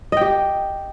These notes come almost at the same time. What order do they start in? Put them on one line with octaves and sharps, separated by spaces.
D#5 G5 G4